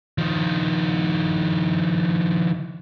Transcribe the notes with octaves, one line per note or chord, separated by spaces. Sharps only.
D#3 F3